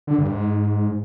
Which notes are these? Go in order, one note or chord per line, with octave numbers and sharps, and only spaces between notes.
D3
G2
G#2